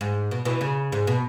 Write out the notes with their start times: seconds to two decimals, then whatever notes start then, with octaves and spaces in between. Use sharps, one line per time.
0.01 G#2
0.31 B2
0.45 B2 E3
0.61 C#3
0.92 G#2
1.07 B2